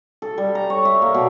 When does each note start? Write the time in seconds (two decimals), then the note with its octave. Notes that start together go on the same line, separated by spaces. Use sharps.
0.22 A4
0.38 G3
0.55 A#5
0.70 C#5
0.85 E5
1.02 A#3
1.14 B2